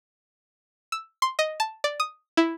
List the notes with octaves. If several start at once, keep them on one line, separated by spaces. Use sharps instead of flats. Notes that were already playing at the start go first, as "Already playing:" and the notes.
E6
C6
D#5
A5
D5
D#6
E4